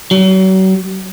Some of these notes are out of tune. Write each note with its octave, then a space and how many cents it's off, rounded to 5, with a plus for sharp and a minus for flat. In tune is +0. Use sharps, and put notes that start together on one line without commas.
F#3 +35